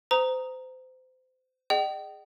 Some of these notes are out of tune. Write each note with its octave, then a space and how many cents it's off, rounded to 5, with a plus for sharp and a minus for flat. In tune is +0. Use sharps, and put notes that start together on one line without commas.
C5 -30 A#5 +0 D#6 +10
G#4 +0 D#5 -40 G5 -40